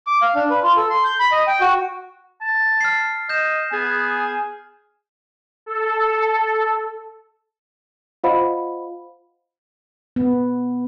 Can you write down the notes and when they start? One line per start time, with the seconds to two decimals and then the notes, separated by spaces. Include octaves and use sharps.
0.07 D6
0.22 F5
0.35 D4
0.50 B4
0.63 F4
0.77 A4
0.90 C6
1.04 G6
1.19 B5
1.32 D#5
1.47 G5
1.61 F#4
2.41 A5
2.81 F6 C7
3.29 D#5 G6 E7
3.73 B3 G#4 G#5
5.66 A4
8.24 F4 C5 D#5 F5 F#5 B5
10.16 B3